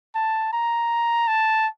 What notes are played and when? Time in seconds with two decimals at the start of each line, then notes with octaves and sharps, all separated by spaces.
0.15 A5
0.53 A#5
1.28 A5